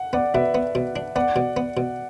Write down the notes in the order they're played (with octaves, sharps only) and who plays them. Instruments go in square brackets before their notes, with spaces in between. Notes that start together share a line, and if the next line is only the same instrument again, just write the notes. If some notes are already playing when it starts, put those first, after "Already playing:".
Already playing: [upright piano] F#5
[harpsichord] B3 [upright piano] D5 F#5
[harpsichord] B2 [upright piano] B4 E5
[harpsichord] B3
B2
D4
[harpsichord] B3 [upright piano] D5 F#5
[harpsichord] B2
B3
B2